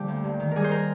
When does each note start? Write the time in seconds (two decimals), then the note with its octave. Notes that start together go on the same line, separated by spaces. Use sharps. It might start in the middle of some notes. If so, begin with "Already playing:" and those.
Already playing: A#2 D3 G3 G4 C5
0.08 D2
0.24 G2
0.40 D#3
0.51 G3 G#4 A#4
0.64 C5
0.72 A#4